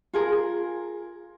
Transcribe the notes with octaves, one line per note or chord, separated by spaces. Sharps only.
F4 G#4 A#4